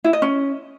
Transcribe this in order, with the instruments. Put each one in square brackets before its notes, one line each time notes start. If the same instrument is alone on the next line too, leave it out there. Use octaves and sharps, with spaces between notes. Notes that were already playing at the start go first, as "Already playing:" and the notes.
[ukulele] E4
D#5
C#4